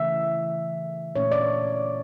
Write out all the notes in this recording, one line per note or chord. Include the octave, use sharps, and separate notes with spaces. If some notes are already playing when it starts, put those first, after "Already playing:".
Already playing: C#3 E3 A3 E5
A#2 A3 C#4 C#5
D5